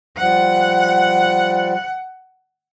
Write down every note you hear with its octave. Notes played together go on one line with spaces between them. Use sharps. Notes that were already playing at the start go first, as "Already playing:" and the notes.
F3 G3 F#5